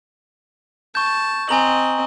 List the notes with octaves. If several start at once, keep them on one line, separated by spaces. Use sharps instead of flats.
A5 C#6 G6
C4 D#5 G#5 A#5 F#7